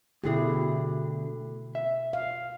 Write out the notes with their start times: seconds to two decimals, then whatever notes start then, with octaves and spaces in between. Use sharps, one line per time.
0.24 D2 B2 D3 E4 G4 G#4
1.75 E5
2.13 F5